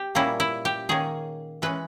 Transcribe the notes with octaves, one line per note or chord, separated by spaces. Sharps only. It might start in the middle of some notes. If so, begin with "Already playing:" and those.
Already playing: G4
A#2 G3 A#3 C#4 E4
E4
G4
D#3 A#3 C#4 G#4
E3 G#3 C#4 B4